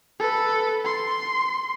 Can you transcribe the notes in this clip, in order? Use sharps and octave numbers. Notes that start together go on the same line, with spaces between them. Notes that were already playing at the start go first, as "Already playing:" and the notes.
A4 B4
C6